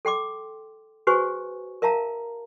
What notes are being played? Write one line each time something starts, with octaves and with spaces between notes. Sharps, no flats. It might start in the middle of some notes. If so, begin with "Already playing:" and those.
A4 G5 C6 D6
F#4 G#4 B4 C5 G#5 C#6
A#4 E5 F5 A5 A#5